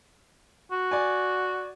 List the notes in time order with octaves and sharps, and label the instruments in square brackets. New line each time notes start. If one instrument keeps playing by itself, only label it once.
[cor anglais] F#4
[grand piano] D5 G#5